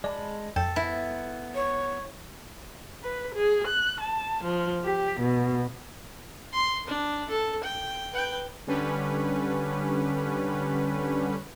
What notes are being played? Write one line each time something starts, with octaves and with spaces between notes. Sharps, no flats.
G#3 D5 A5 B5
F2 A4 G5
B3 E4
C#5
B4
G#4
F#6
A5
F3
G4
B2
C6
D4
A4
G5
B4 G5
D3 G3 C#4 B4